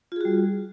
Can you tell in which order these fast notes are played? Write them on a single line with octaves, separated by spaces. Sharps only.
F4 G#4 F#4 G3